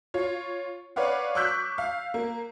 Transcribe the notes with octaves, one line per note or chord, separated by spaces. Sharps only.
F4 C#5
B4 C#5 D5 F5 F#5
C#6 D6 E6 F#6 G6 B6
F5
A#3